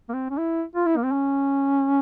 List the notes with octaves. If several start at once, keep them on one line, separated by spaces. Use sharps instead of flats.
A#3
C4
C#4
E4
F4
E4
A#3
C4
C#4